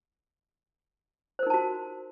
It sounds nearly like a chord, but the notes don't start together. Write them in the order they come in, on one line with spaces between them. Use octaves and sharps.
C5 A#4 D#4 A5 F#4